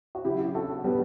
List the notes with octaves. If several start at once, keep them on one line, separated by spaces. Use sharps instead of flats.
F#4
C#3 F#3 E4 G4
F#4 A4
G3 B3